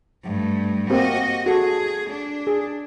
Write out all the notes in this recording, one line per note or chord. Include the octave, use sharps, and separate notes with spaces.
G2 A3
A#3 C4 F#4 G4 D#5
F#4 G#4 A4
D4
G#4